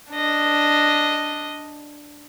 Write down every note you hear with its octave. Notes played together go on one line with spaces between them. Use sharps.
D4 D#5